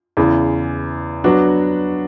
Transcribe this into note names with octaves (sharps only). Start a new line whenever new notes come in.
E2 C#3 E3
F#3 B3 D4 F#4